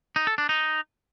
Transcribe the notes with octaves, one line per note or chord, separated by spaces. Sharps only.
D#4
A4
D4
D#4